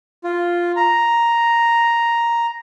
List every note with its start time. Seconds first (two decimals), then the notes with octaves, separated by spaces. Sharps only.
0.24 F4
0.76 A#5